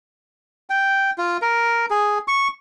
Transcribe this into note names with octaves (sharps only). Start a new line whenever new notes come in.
G5
F4
A#4
G#4
C#6